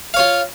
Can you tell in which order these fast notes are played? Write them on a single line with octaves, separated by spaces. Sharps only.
F5 C#5 F4